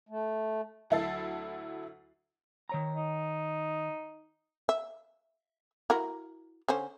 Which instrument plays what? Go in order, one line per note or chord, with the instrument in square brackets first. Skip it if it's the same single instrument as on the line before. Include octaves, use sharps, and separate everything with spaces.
[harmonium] A3
[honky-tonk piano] D2 F#3 E4 A4 A6 C7
[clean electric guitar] D#3 C#5 A#5
[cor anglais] D#4
[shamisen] E5
E4 F#4 A#4
D3 C#4 C5